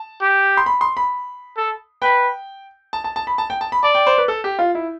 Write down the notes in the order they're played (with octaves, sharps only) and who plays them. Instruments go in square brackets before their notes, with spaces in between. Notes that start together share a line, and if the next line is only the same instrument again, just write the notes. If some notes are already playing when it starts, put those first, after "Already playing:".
Already playing: [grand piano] A5
[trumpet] G4
[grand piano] C6
B5
C6
B5
[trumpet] A4
[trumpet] B4 [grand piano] G5
[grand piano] A5
A5
A5
B5
A5
G5
A5
B5
[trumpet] D5 [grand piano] A5
[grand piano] G5
C5
B4
A4
G4
F4
E4